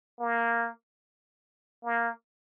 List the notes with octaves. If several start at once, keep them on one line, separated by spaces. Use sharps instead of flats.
A#3
A#3